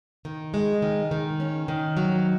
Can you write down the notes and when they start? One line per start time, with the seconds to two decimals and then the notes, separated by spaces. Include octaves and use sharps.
0.25 D#3
0.54 G#3
0.82 D#3
1.11 D#3
1.40 C#4
1.68 D#3
1.97 F#3